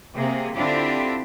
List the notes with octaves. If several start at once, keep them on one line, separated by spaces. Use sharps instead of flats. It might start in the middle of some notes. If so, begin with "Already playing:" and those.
C3 A#3 G#4
D3 C4 D4 E4 F4 G4